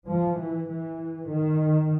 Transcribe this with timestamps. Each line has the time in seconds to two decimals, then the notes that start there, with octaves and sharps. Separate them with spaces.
0.09 F3
0.39 E3
0.69 E3
1.30 D#3